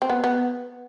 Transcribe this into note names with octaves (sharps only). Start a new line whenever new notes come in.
C4
B3
B3